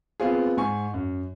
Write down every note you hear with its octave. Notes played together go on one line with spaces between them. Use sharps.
B3 C4 F4 G#4
G#2 G#5 C#6
F#2